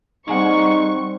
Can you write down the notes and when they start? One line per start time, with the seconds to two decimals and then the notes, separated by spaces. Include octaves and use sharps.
0.28 G3 A#3 C4 D#4 G#4 F#5 C#6